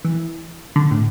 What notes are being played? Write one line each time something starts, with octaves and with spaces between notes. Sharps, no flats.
E3
D3
A2